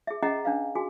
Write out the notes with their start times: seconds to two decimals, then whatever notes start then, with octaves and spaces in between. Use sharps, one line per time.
0.07 G#4 E5
0.22 C#4 G#4 D#5 E5 F#5 A#5
0.45 C#4 D4 B4 F5
0.75 F#4 G#4 G#5